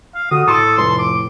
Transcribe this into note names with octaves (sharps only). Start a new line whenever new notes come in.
F5
D3 F#4 D#6
A2 A4 C6 D6 D#6
F1 C6
D6